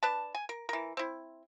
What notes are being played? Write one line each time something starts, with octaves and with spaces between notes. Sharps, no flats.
D4 B4 A5
G#5
A#4
E3 A#4
C4 E4